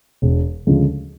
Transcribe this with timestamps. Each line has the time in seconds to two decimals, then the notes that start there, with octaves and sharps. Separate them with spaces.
0.22 E1
0.67 D2 C#3 F3 G#3